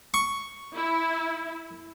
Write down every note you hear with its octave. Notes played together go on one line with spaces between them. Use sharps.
C#6
E4